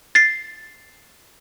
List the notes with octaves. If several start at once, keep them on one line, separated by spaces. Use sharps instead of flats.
A6 C7